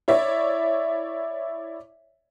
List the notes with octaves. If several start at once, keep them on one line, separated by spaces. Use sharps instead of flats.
E4 C#5 D5 E5